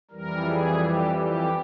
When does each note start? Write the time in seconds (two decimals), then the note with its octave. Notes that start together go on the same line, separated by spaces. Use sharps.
0.11 F2 E3 G3 A#4
0.45 G#4
0.80 G4
1.15 G4